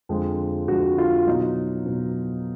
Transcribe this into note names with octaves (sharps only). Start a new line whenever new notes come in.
F2 D3 F3 G#3
F2 D3 F3 G#3 F#4
F4
B2 F#3 D#4
B2 F#3